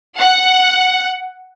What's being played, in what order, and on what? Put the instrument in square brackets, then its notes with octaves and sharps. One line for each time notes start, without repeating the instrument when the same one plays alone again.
[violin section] F#5